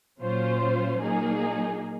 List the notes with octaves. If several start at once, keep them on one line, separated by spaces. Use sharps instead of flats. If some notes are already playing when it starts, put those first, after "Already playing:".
A#2 F#3 C#4 F4 C5
A#2 F#3 A#3 D#4 G#4